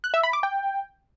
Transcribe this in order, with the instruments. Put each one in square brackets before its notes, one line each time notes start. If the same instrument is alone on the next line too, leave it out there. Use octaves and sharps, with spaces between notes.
[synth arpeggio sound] F#6
E5
B5
D6
G5